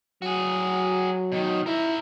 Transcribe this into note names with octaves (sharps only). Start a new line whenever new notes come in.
F#3 F#4 G#4
B2 D#3
E4 A#4 E5